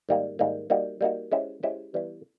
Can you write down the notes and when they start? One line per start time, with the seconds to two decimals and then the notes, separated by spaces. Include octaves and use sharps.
0.09 G#2 D#3 G3 A#3
0.39 G#2 D#3 G3 A#3
0.70 G3 A#3 D#4 F#4
1.01 G3 A#3 D#4 F#4
1.32 G#3 C#4 E4 G4 C5
1.63 G#3 C#4 E4 G4 C5
1.94 E3 G3 B3 E4